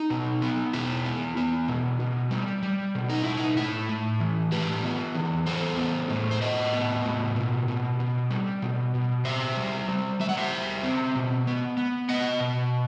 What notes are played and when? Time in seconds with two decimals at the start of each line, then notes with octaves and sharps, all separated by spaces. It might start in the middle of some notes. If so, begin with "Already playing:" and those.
Already playing: D#4
0.10 B2
0.42 B3
0.73 B2 E4
1.06 B3
1.37 B3
1.68 B2
2.00 B2
2.31 G3
2.63 G3
2.95 B2
3.09 D#4
3.23 B2 E4
3.37 D#4
3.57 A2 E4
3.89 A2
4.20 E3
4.52 A2 G4 B4
4.84 B3
5.15 E3
5.46 B3 A4 C5
5.78 B3
6.10 A2
6.31 C5
6.42 A2 B4 D#5
6.73 B3
7.05 A2
7.36 B2
7.68 B2
8.00 B2
8.30 G3
8.62 B2
8.95 B2
9.25 B2 C5 E5
9.57 G3
9.89 G3
10.20 G3 E5
10.29 F#5
10.37 C5 E5
10.51 G3
10.83 C4
11.15 B2
11.47 B3
11.77 B3
12.09 B3 D#5 F#5
12.40 B2